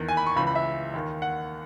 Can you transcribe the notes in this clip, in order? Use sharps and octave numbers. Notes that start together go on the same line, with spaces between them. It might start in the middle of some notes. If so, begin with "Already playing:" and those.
Already playing: E2 D#3
G#5
B5
C#6
C#2 C#3 E3 B5
B5
E5
D#2 D#3
F#5